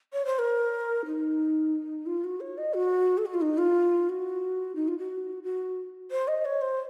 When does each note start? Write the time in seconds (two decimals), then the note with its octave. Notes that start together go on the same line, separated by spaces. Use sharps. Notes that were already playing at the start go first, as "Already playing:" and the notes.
0.13 C#5
0.25 C5
0.39 A#4
1.06 D#4
2.06 F4
2.24 F#4
2.40 C#5
2.58 D#5
2.74 F#4
3.18 A4
3.26 F#4
3.34 F4
3.41 D#4
3.58 F4
4.09 F#4
4.75 D#4
4.88 F4
4.98 F#4
5.43 F#4
6.11 C5
6.28 D#5
6.45 C#5
6.61 C5